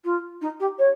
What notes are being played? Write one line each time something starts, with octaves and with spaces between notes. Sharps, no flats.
F4
D#4
G4
C#5